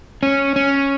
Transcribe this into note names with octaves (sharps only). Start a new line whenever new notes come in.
C#4
C#4